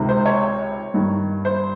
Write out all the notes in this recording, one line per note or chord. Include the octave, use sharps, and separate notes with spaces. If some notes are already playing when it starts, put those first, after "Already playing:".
Already playing: C#2 C3 D#3
C5
C#5
G2 D#3
C5